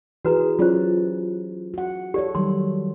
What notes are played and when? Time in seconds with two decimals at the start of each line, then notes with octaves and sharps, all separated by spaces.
0.25 E3 F#4 G#4 B4 A#5
0.59 F#3 C#4 F4 G4 C5 D5
1.74 F#4 F#5
2.14 G4 A4 C#5 D5
2.35 D#3 F#3 G3 C6